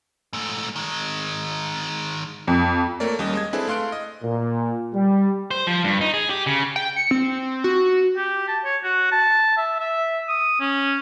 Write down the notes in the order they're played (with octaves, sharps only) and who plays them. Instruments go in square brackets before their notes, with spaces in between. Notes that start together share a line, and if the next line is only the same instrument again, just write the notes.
[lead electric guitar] G#2 A3
D#3 G#3
[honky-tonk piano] F2
[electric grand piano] A3 A#3 A#4 C#5 D5
D#2 G3 C#4 D#5
G#3 D#5 G#6
C4 D4 E4 G#4 A4 B4
A3 F5 C6 F#6 D7
D#5
[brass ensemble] A#2
G3
[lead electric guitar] C5
F3
G2
D#4
G#4
G4
C#3
[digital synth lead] G5
C#7
C4
F#4
[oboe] G4
A5
C#5
F#4
A5
E5
E5
D#6
C#4